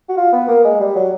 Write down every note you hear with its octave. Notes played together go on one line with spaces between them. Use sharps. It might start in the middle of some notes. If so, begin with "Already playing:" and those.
F#4
F4
B3
A#3
G#3
G3
F#3